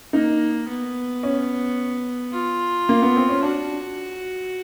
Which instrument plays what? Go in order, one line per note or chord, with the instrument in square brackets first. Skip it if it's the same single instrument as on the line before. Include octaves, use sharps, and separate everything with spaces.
[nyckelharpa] A#3 [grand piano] D#4
[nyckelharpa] B3
[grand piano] C#4
[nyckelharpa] F4
[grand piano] A#3
B3
C4
C#4
[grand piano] D4 [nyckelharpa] F#4